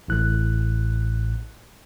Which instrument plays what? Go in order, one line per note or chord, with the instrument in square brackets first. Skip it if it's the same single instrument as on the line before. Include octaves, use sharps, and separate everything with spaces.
[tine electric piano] A1 A2 F#6